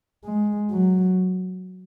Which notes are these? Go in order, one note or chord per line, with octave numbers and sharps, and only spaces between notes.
G#3
F#3